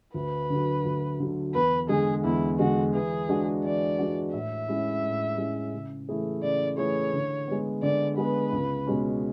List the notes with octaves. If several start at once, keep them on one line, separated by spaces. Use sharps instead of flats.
D2 B4
D3 F#3
D2
D3 F#3
E2 B4
D3 G#3 G#4
E2 E4
D3 G#3 F#4
E3 G#4
G#3 D4 F#4
E3 D5
G#3 D4 F#4
A2 E5
G#3 C#4 E4
A2
G#3 C#4 E4
C#3
E3 A3 E4 G#4
C#3 D5
E3 A3 E4 G#4 C#5
D3
G#3 B3
D3 D5
G#3 B3 B4
C#2
B2 G#3 C#4